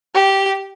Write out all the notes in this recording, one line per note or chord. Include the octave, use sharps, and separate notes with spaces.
G4